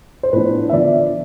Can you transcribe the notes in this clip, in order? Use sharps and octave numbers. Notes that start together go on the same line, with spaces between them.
C5
A2 F3 B3 D4 B4
E5
D3 F3 B3 D5